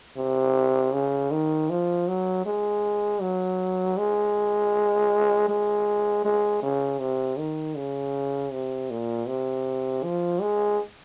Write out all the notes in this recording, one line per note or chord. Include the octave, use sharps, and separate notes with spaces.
C3
C#3
D#3
F3
F#3
G#3
F#3
G#3
G#3
G#3
C#3
C3
D#3
C#3
C3
A#2
C3
F3
G#3